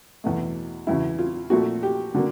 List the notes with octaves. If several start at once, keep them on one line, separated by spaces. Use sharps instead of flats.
E2 B2 F#3 A3
E2 C#3 F#3 E4
F4
A#2 F3 A3 F#4
G4
D3 F#3 A#3